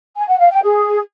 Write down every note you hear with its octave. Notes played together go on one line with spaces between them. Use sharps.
G#5
F#5
F5
G5
G#4